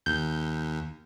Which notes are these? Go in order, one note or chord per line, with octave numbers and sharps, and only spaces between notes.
D#2 G6